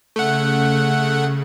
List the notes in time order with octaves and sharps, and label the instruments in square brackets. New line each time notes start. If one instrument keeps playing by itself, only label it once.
[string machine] C#3 [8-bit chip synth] A3 F#5